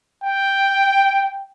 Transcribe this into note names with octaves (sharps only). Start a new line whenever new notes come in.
G5